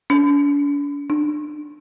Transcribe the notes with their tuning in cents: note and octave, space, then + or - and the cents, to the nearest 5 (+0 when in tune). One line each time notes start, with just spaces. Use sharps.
D4 -45
D4 +30